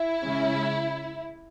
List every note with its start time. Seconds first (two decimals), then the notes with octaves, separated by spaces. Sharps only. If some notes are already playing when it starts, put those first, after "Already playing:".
Already playing: E4
0.22 C#3 G#3 C#4